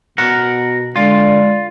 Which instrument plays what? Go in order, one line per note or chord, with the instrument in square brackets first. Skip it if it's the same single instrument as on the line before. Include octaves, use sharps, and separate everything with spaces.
[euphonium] B2 [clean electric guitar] A#4 F#5
[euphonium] D3 [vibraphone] G#3 D5 [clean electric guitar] F4